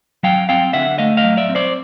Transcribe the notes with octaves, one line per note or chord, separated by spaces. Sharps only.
F#3 F5 G5
C4 F5 G5
D3 E5 F#5
A3 D#5 F5
D#5 F5
F#3
D5 E5
C4
C5 D5